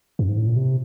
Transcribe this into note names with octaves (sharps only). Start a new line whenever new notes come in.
F#2
G#2
A2
A#2
C3